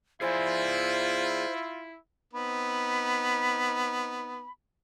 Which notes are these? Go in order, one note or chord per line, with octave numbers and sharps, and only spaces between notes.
E4 F4 G#4 C5 D5 G#5
B3 C4 D#4 B5